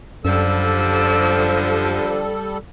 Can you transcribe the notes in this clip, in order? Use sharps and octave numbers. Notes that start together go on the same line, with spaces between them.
F#2 D3 F3 G3 A4 D5 E6